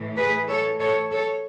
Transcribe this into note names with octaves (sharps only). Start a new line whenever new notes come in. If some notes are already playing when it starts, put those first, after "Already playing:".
Already playing: A2 E3 A3
G#4 B4
A4 C#5
A4 C#5
A4 C#5